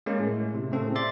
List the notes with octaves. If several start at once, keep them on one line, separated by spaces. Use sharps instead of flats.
G#3 A#3 C#4
A2
C3
A2 C#3 C4 A4
D5 E5 C6 A6